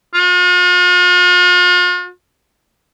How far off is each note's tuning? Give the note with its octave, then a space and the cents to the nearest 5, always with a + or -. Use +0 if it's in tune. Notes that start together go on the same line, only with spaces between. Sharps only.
F4 +45